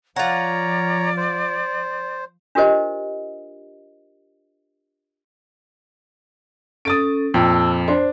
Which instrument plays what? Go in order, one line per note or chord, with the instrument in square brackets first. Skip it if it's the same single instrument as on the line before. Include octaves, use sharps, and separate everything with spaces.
[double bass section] F3 [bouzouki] F4 F#5 [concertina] C#5 A#5 [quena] D5
[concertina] C5
[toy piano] D4 F4 G4 A#4 C5 D#5
[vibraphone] C#4 A4 [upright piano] D#6 A6 D7
[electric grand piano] F2 [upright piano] A#2 G5 [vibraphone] A5 E6
[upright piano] D4 C6 [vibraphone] C5